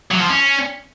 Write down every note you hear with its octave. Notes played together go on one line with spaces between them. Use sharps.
F#3
F3
C#4